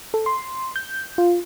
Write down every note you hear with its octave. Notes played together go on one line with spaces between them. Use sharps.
A4
C6
G6
F4